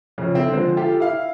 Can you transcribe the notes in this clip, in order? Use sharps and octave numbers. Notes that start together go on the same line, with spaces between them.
F2 C#3
C4 E4 A4
D3 F3 G#3 C5
F4 G4 A4
E4 F5